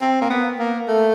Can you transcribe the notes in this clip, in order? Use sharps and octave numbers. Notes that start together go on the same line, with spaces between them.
C4
A#3
B3
A#3
A3